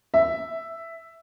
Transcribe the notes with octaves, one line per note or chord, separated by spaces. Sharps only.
E5